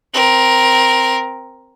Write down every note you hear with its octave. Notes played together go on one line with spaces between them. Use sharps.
C4 A#4